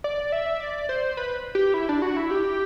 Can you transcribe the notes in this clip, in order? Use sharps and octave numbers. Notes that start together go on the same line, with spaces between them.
D5
E5
D5
C5
B4
G4
E4
D4
F#4
E4
G4